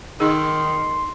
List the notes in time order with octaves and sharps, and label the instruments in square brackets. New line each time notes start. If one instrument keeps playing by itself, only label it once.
[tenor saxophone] D#3 [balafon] D#4 G#4 [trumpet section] C6